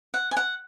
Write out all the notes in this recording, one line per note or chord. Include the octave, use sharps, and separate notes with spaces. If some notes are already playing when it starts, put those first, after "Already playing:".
F#5
G#5
F#5